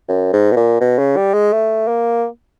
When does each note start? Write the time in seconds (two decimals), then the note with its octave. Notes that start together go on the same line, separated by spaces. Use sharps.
0.08 F#2
0.33 G#2
0.52 B2
0.56 A#2
0.80 B2
0.98 C#3
1.17 G3
1.34 G#3
1.53 A3
1.88 A#3